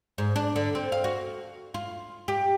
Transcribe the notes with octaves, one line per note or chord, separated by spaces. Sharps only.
G#2
D4
D3
C4
F5
F#4
F4
G4